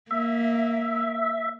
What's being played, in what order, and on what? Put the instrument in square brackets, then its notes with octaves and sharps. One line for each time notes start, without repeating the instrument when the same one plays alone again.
[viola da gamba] A#3 [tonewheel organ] E5